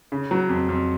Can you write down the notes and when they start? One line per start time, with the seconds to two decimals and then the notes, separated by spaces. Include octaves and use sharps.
0.12 C#3
0.31 F#3
0.49 F2
0.69 F2